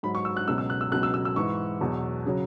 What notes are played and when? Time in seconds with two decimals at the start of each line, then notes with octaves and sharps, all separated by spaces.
0.03 G#2 F#3 B5
0.15 C#6
0.25 E6
0.37 F#6
0.48 C#2 B2 F#3 E6
0.58 E6
0.70 F#6
0.81 E6
0.92 C#2 B2 F#3 F#6
1.03 E6
1.14 E6
1.25 E6
1.36 G#2 E3 C#6
1.81 E2 B2 F#3
2.26 C#3 F#3